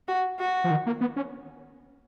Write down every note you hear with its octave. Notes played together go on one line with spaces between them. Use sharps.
F#4
F#4
F3
D#3
A#3
B3
C#4